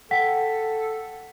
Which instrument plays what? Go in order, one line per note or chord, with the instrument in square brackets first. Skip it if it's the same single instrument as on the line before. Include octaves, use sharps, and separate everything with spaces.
[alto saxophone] A4 [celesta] F#5 G5 B6